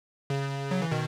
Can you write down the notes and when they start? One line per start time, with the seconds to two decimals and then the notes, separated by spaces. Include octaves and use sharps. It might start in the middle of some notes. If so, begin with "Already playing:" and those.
0.30 C#3
0.71 F#3
0.82 E3
0.91 B2 D#3